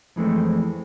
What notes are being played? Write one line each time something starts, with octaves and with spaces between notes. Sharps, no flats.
F2 E3 G#3 A3 C4